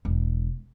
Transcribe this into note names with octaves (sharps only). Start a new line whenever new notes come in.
E1